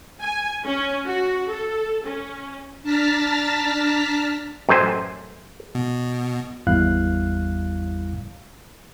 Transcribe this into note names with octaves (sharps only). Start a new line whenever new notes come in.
G#5
C#4
F#4
A4
C#4
D4 A5 A#5 F6 A6 B6
A1 F#2 A3 C5 G#5
B2
G#1 E2 G3 E4 F5 F#6